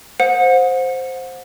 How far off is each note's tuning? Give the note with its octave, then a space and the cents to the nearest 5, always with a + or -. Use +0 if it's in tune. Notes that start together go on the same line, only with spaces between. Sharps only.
C5 +0 F#5 -35